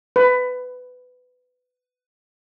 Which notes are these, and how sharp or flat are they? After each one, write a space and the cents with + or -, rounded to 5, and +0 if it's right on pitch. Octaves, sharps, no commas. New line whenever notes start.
B4 +20